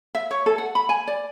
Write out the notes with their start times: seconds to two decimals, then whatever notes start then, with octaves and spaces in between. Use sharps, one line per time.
0.15 E5
0.31 C#5
0.46 A4
0.58 F#5
0.75 B5
0.89 G#5
1.07 D5